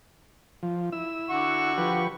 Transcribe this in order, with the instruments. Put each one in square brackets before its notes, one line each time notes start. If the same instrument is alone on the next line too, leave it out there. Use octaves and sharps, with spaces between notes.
[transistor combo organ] F3
E4 E6
[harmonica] D3 F#4 C#6
[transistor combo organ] F3 G4 B4